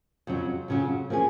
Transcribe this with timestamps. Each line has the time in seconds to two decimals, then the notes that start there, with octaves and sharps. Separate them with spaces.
0.27 F2 C#3 F#3
0.68 F2 C#3 F#3
1.10 F3 A#3 C#4 G#4